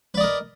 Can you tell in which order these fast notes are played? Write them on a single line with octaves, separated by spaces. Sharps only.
B4 D5 D#5 A#4